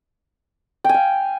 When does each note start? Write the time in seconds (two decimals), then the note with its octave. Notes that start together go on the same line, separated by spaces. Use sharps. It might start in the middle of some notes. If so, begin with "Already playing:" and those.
0.84 G5
0.89 G#5
0.94 F5